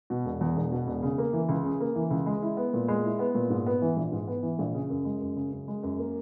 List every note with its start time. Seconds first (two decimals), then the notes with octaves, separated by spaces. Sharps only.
0.10 B2
0.25 E1
0.41 E2
0.56 E1
0.72 B2
0.87 E1
1.03 C#3
1.18 A#3
1.33 E3
1.49 C#2
1.64 C#3
1.80 A#3
1.96 E3
2.11 C#2
2.26 G#3
2.42 E4
2.57 B3
2.74 A#2
2.88 G#3
3.05 E4
3.19 B3
3.35 A#2
3.50 G#2
3.66 B3
3.82 E3
3.96 A#1
4.12 G#2
4.28 B3
4.43 E3
4.58 A#1
4.74 C#3
4.90 F#2
5.05 G#3
5.21 F#2
5.36 C#3
5.52 F#2
5.68 G#3
5.83 F#2
5.98 A#3